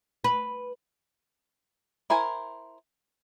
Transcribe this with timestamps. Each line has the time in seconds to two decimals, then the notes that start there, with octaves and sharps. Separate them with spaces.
0.24 B4
2.10 E4 A#4 C5 G#5